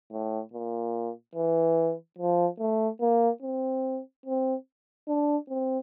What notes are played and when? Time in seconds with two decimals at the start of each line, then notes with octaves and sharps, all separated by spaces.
0.12 A2
0.53 A#2
1.35 E3
2.18 F3
2.59 A3
3.01 A#3
3.42 C4
4.26 C4
5.08 D4
5.49 C4